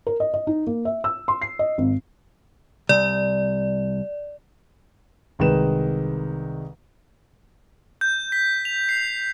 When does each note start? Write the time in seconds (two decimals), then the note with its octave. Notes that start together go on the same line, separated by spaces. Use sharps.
0.07 A#4
0.20 D#5
0.34 D#5
0.47 D#4
0.67 A#3
0.85 E5
1.04 E6
1.28 C6
1.42 C7
1.59 D#5
1.78 G#1
2.89 C2 D5
5.39 C2 D#3 G#3 B4 E7
8.01 G6
8.32 B6
8.65 F7
8.89 C7